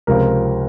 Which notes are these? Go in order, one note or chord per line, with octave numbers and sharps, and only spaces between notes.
C#2 C3 F3 C4 A#4